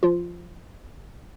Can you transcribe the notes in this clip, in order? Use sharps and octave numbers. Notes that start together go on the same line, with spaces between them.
F3 F4